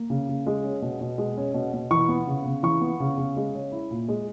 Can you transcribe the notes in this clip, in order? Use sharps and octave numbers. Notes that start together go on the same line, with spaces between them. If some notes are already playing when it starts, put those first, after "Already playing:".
Already playing: A#3
C#3
C#3
G#3
C#4
B2
B2
G#3
C#4
B2
B2
E3 C#6
B3
C#3
C#3
E3 C#6
B3
C#3
C#3
G#3
C#4
E4
A#2
G#3